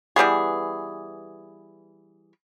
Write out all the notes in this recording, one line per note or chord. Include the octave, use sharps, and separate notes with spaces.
E3 G3 B3 G#4